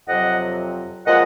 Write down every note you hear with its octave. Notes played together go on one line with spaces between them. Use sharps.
F2 C3 F#3 D#5 F#5
A#2 F3 G#3 D#5 F#5